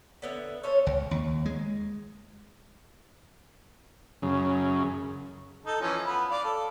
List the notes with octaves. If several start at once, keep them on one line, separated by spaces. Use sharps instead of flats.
D3 B3 E5
C#4 A4 C5 C#5
C#2
D#2
G#3
F#2 C#3
D#4 A4
E3 F3 C#4
B3 B4
D5 F5
A4